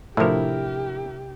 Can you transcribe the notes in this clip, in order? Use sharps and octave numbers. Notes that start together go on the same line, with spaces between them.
A2 C3 F3 D4 E4 G4 A#4